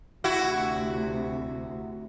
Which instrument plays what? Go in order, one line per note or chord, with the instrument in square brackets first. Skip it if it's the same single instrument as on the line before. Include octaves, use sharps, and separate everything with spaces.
[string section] D2 C3 [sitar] E4 F#4